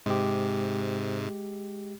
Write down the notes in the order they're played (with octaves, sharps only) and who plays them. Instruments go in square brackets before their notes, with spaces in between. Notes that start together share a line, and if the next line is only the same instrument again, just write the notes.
[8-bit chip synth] G#2 C3 [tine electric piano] G#3 G4